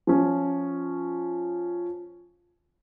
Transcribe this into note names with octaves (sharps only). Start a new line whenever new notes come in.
F3 C#4